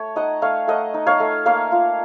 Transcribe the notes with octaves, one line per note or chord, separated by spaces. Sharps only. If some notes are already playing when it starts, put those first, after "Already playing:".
Already playing: A3 C#5
D#4 D#5 F#5
A3 C#5 F5
A3 D#5 F#5
D#4
C#5 F5
A3
A#3 C#5 F5
F4